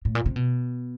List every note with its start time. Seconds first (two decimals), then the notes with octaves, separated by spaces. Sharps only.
0.05 A2
0.15 A#2
0.26 C3
0.36 B2